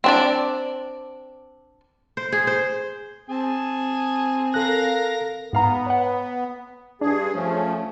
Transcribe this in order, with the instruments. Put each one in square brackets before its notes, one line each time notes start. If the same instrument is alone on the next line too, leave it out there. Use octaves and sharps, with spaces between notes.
[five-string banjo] C4 D4 D5
[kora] C5
G#4
C5
[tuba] C4 [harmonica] G#4 G#5 A5
[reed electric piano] A4 F#6 [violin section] A#4 F5 A#6
[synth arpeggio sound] G#2 F5 A#5 [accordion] B3
[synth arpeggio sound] C#5 F#5
[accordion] G2 G#4 [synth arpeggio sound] D4
[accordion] F3 A3 C#4